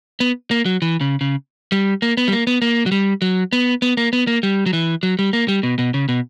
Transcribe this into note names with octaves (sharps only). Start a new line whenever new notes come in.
B3
A#3
F#3
E3
C#3
C#3
G3
A#3
B3
G3
A#3
B3
A#3
F#3
G3
F#3
B3
B3
A#3
B3
A#3
G3
F#3
E3
F#3
G3
A#3
G3
B2
B2
C#3
B2